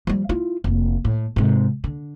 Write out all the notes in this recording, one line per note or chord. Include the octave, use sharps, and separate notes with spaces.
F3 G3
E4 F4
F1 A#3
A2
G#2 C3
D3